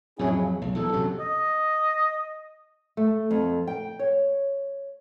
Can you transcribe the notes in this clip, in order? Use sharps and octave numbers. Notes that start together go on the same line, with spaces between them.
F2 A2 F#3 C#4 E4 G#4
C#3
E2
B1
B1 E2 A#2 A4
F#2 C3 F#3
D#5
A3
F2
G5
C#5